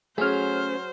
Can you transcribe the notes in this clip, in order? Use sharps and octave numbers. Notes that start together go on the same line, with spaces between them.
F#3 A3 C#4 G#4 C5 F6